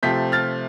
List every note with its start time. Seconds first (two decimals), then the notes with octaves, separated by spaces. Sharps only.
0.03 C3 F3 A3 C4 G6 B6
0.32 F6 A6